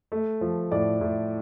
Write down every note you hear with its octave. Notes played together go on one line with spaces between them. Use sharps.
A3
F3
A2 D5
A2